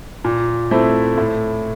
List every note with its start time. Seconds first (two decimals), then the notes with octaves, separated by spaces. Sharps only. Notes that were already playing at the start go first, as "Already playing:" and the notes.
0.25 A#2
0.71 A3 C4 E4
1.18 A2